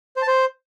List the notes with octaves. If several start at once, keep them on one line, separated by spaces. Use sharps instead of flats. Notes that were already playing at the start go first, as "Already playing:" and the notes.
C5
A5
C5